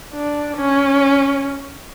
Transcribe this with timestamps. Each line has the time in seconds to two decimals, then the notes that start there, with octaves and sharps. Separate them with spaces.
0.13 D4
0.57 C#4